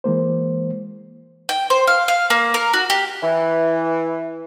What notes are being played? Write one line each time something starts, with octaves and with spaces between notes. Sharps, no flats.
E3 G#3 A#3 C5
G5
C5
F5
F5
A#3
A#4
F#4
G4
E3